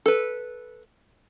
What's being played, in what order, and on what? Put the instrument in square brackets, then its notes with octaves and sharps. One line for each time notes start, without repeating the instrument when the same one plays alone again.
[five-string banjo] A4 B4